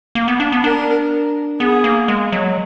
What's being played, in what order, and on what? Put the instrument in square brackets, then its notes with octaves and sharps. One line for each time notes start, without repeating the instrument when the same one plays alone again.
[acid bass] A#3
B3
D4
B3
[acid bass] D4 [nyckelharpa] A#4
[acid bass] B3 [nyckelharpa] G#4
[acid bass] A#3
G#3
F#3